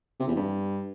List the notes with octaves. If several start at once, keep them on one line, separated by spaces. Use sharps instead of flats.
C3
E2
G2